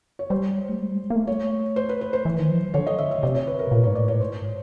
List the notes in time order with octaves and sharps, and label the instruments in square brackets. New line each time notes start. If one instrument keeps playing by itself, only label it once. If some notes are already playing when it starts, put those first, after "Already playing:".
[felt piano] C#5
[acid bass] G3 [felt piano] C5
[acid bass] A3
G#3
G3
G#3
A#3
A3
[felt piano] C#5
C5
B4
B4
C5
[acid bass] E3
D#3
F3
F#3
D#3
[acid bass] D3 [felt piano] C#5
[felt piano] D#5
E5
E5
[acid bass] C3 [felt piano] D5
[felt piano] C#5
B4
A#4
[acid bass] A#2
[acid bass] G#2 [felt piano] C#5
[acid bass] A2 [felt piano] D5
[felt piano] C#5
[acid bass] G#2 [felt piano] C5